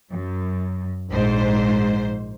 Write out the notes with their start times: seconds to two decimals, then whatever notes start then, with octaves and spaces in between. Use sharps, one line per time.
0.11 F#2
1.10 A#1 G#2 C5